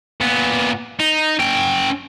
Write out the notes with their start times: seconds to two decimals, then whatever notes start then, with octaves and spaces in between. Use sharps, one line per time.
0.21 A#2 B3
1.00 D#4
1.39 C#4 G5